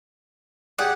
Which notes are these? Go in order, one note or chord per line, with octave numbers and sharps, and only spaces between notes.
G4 G#4 D5 F#5